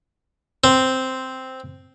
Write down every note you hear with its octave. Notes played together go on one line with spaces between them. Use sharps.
C4